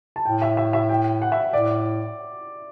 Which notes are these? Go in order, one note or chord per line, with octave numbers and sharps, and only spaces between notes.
A5
A2 G5
E5
E5
E5
G5
F#5
E5
A2 D5